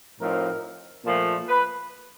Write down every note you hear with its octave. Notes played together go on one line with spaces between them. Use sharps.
A2 F3 A3 C4 D#4 A#4
A#2 F3 A3
B4